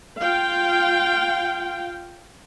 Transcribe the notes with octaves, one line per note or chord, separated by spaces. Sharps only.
F4 F5 G5